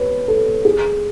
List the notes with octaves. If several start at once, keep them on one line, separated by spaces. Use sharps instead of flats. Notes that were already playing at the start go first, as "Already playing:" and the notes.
Already playing: B4 C#5
A4
G#4